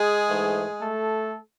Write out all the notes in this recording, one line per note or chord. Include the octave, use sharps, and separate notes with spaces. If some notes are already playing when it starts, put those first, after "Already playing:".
Already playing: G#3 G#4
G#2 E3 A3
A3 A4